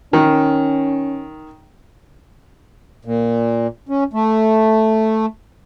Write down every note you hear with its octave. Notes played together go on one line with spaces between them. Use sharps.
D#3 C#4
A#2
C#4
A3